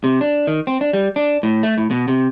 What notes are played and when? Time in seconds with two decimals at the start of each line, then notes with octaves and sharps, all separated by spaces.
0.04 C3
0.21 D4
0.47 D#3
0.67 C4
0.81 D4
0.93 G3
1.16 D4
1.43 A2
1.63 A3
1.78 A2
1.91 B2
2.08 C3